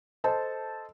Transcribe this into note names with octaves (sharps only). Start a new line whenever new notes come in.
A4 C5 D#5 A5